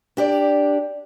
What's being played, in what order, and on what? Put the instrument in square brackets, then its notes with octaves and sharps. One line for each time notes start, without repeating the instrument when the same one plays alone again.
[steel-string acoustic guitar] D4 G4 D5